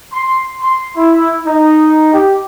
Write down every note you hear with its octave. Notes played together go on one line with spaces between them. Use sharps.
C6
C6
E4
D#4
G4